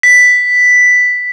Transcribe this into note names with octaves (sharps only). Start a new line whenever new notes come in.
B6